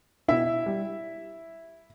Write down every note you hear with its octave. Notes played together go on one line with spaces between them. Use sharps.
B2 E4 E5
G3